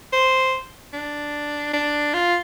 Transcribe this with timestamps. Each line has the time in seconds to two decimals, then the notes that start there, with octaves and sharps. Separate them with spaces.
0.13 C5
0.93 D4
1.73 D4
2.14 F4